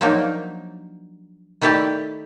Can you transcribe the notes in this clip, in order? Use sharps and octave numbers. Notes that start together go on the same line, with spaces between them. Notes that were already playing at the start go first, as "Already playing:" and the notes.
F3 F#3 A#3 D4 D#4
D#3 A3 E4 G4 D5 A5